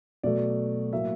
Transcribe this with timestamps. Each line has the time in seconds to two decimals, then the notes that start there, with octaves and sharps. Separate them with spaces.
0.23 B2 F#3 A3 D5
0.93 A2 F#3 A#3 E5